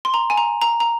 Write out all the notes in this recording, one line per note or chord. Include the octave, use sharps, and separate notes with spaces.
C6
A#5
G#5
A#5
A#5
A#5